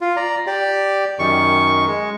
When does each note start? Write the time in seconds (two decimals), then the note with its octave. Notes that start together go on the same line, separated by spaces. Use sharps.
0.01 F4
0.16 D5 A#5
0.47 G4 D5
1.19 F#2 D#3 C#6
1.87 G#3